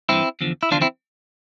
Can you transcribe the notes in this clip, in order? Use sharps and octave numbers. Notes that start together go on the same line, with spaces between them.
G2 E3 C4 E4
E2 D3 F3
E4
E2 D3 F3 D4 F4
C4 E4